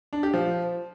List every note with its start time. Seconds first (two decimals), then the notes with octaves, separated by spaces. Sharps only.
0.13 D4
0.23 G4
0.34 F3